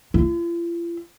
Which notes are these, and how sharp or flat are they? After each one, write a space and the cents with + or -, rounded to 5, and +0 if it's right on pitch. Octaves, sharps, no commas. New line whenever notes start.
F4 -45